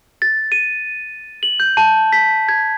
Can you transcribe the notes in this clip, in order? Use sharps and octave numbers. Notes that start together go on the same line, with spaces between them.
A6
D#7
F#7
G6
A5
B6
G#6